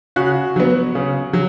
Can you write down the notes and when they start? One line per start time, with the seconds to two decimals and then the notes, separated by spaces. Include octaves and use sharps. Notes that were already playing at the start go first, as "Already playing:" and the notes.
0.16 C#3 F#4
0.56 F#3 B3
0.95 C#3
1.33 F#3